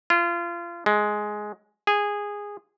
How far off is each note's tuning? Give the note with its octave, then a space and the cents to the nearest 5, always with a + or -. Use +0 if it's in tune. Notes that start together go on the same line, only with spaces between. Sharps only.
F4 -30
G#3 +10
G#4 -15